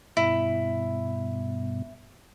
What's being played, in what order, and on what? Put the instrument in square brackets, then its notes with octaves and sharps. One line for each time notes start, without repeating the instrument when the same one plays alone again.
[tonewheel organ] G2 B2 [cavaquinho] E4